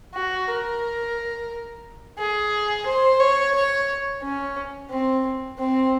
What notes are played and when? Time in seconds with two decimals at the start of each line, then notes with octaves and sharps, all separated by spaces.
0.15 F#4
0.48 A#4
2.18 G#4
2.86 C5
3.20 C#5
3.55 C#5
4.23 C#4
4.91 C4
5.59 C4